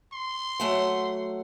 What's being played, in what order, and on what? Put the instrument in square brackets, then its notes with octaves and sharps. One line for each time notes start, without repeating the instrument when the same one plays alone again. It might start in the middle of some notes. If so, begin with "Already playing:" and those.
[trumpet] C6
[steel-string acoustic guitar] F#3 A3 F#5